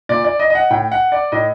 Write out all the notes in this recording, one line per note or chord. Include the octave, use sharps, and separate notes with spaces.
A#2 D5
D5
D#5
D#5
F#5
A2 G5
F#5
D5
A2 D#5